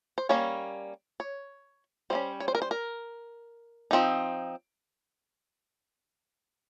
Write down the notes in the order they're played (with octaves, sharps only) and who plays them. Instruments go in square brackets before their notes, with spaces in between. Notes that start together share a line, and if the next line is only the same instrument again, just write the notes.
[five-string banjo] C5
G3 A#3 C#4 C#5
C#5
G3 A#3 C#4 C5
C#5
C5
A#4
C5
A#4
F3 C4 D#4